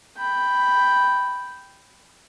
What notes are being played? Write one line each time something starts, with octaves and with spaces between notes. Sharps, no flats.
G5 B5